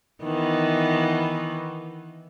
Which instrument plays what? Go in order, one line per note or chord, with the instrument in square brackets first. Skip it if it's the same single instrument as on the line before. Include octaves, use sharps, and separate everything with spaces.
[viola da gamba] D#3 E3 B3